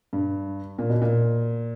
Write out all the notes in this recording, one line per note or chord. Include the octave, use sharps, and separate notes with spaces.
G2
A#2
B2
A#2